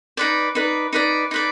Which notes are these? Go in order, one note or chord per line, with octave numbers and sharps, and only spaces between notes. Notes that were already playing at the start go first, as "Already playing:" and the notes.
D#4 B4 D5
D#4 B4 D5
D#4 B4 D5
D#4 B4 D5